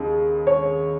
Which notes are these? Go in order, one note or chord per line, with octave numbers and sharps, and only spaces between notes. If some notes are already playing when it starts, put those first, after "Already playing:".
Already playing: D#2 C#3 G#3
C#5